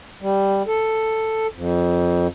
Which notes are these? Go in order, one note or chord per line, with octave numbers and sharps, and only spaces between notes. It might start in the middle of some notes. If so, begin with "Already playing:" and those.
G3
A4
F2